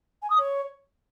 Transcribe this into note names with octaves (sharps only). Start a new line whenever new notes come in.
G#5
D#6
C#5